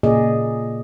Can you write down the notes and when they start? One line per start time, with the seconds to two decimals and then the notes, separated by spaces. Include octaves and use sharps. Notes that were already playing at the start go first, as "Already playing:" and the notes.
0.03 A#2 C#3 A#3 G#4 D5 D#5